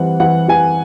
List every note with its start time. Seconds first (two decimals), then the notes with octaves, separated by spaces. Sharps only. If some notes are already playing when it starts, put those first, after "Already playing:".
Already playing: E3 G3 C4 F#5
0.20 E3 F#5
0.48 E3 G#5